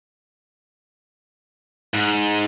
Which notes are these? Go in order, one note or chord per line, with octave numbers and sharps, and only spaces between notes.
G#2